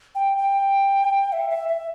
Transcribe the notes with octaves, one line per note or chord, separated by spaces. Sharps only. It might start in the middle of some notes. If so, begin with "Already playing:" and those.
G5
G5
E5
E5
E5